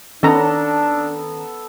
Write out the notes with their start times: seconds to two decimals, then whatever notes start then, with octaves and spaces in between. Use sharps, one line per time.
0.23 D#3 B3 C#4 D4 A4 A#5